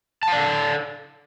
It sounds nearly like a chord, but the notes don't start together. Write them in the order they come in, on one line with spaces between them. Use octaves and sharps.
A5 F5 D5 A4